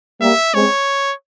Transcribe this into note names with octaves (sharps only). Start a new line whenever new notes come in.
G3 A#3 E5
G#3 C4 C#5